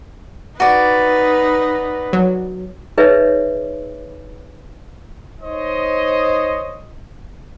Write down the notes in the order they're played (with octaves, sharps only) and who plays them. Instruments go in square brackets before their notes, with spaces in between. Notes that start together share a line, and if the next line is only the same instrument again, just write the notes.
[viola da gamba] D#4 B4 [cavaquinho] F#4 D5
[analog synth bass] F#3
[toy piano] D#4 G#4 B4 C#5 D#5 E5
[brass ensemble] D#4 C5 C#5 D#5